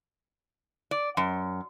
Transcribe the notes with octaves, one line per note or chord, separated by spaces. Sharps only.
D5
F#2